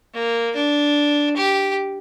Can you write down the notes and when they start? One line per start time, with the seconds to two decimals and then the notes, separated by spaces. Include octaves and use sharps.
0.14 A#3
0.55 D4
1.37 G4